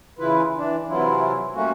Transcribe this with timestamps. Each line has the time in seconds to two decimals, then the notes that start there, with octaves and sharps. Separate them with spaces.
0.19 C#3 E3 E4 F4 B4
0.57 E3 D4
0.89 C3 E3 F#3 E4 F4
1.54 G3 A3 A#3 C#4 F#4